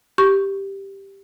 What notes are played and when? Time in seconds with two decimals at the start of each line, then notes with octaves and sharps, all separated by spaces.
0.18 G4 C#6